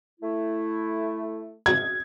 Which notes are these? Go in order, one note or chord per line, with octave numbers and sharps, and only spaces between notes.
A3 E4
G#6